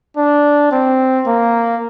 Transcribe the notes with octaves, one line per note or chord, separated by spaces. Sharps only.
D4
C4
A#3